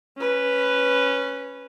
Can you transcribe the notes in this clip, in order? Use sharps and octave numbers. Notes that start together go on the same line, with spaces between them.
C#4 B4